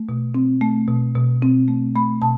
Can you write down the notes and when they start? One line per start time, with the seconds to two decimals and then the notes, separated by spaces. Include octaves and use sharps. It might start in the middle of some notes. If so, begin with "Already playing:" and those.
Already playing: A3
0.09 B2
0.35 C4
0.61 A3
0.88 B2
1.15 B2
1.42 C4
1.68 A3
1.95 A3 B5
2.22 B2 A5